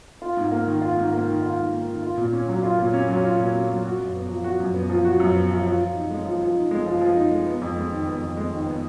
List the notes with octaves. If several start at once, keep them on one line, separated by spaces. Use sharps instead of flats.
F4
G#2
A#3
D#3
F4
G#2
A#3
D#3
F4
G#2
A#3
D#3
F4
A#2
C#4
F#3
F4
A#2
C#4
F#3
F4
A#2
C#4
F#3
F#4
F#2
B3
F3
F#4
F#2
B3
F3
F#4
F#2
B3
F3
F3
F3
D#4
G#3
F3
F3
D#4
G#3
F3
F3
D#4
G#3
B3
F2
G#3
D#3
B3
F2
G#3
D#3
B3